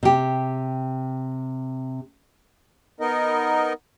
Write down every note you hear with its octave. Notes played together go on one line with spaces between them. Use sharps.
C3 G4
B3 D#4 A#4 D#5